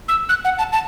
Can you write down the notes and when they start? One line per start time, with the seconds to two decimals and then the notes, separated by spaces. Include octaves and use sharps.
0.08 E6
0.29 F#6
0.45 F#5
0.58 A5
0.72 A5